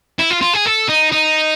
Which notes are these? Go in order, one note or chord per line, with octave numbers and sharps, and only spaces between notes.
E4
F4
F4
G#4
A4
D#4
D#4